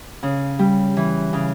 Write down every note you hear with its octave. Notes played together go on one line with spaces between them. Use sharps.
C#3
G3
E3
C#3